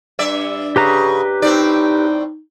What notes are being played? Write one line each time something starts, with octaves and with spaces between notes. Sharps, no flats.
G2 D5 E5
C#3 G4 B4 A#5
A2 C4 D#4 D5